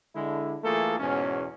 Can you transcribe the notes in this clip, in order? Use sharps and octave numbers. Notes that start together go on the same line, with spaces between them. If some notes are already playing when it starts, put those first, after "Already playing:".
D3 G#3 E4
E3 A3 A#3 F4 G#4 A4
E2 G#2 B2 C#4